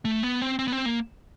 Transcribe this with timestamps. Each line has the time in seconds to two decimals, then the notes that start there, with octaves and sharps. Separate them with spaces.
0.05 A3
0.23 B3
0.42 C4
0.59 C4
0.68 B3
0.72 C4
0.86 A#3